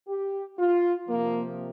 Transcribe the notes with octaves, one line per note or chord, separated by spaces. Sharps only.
G4
F4
C3 F3 A#3